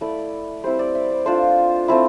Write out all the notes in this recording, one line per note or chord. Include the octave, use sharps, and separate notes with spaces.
A3 E4 D5
G3 C4 E4 C5
D5
E5
D5
A3 D4 F4 C5
A3 C4 E4